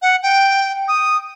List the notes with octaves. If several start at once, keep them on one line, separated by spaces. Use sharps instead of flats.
F#5
G5
D#6